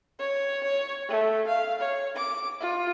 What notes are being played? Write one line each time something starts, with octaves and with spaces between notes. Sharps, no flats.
C#5
C#5
A3
F5
C#5
D6
F4